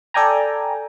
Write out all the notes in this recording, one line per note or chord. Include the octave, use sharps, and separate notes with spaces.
A4 D5 G5 G#5 A#5